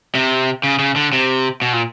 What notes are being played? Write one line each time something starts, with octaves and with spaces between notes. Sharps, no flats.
C3
C#3
C#3
D3
C3
B2
A#2